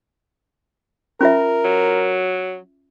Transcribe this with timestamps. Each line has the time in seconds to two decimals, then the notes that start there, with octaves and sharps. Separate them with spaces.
1.21 C#4 F4 A#4 E5
1.65 F#3